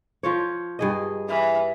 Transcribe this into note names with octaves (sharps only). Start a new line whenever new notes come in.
F3 F4 C#5
G2 G#4 D#5
E3